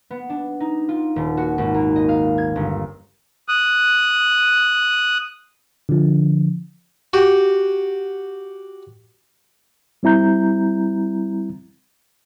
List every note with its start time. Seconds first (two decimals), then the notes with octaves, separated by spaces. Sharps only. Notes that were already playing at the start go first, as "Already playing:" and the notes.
0.10 B3
0.29 D4
0.60 D#4
0.89 F4
1.16 D#1
1.37 F#4
1.58 G#1
1.74 A#3
1.96 D#5
2.09 F5
2.38 G#6
2.56 G1
3.48 D#6 F#6
5.89 D3 F3
7.13 F#4 G4
10.03 G3 C4 E4 A#5 G6